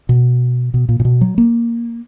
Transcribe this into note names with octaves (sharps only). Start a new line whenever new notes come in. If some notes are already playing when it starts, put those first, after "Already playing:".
B2
B2
A#2
A#2
B2
F#3
A#3